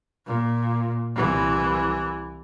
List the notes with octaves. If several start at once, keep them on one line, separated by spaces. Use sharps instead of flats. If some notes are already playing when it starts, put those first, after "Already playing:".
A#2
C2 E3